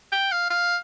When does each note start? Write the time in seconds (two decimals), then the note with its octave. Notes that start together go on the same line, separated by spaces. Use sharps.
0.12 G5
0.32 F5
0.50 F5